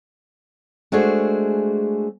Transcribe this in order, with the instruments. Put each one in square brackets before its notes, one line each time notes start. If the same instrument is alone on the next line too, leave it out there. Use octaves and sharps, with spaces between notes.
[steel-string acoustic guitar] G#3 A3 D4 F#4 G#4 C5